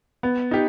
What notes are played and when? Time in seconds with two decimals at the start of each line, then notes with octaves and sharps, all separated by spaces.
0.23 B3
0.51 D#4 G4